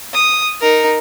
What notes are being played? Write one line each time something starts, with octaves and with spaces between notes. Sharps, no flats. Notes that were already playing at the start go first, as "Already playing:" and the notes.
D#6
D#4 A#4